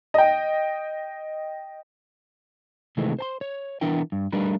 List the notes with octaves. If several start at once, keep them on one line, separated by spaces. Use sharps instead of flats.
D#5 G5
C3 D#3 E3 G#3 A3 C4
C5 A5 C6
C#5
E3 B3 D4 E4 A#4 G5
G2
G3 A3 D4 D#4 A#4 B4